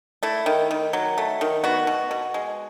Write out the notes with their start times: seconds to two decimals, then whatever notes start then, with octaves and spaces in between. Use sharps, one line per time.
0.23 A3 E4
0.46 D#3
0.71 D#3
0.93 F#3
1.18 A3
1.41 D#3
1.64 B3 F#4
1.87 B2
2.11 B2
2.34 G#3